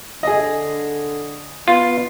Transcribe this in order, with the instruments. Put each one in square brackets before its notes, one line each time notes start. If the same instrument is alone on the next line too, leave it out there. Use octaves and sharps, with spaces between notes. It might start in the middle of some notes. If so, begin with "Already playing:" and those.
[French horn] D3 [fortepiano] G#4 D#5
[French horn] B3 [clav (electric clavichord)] F4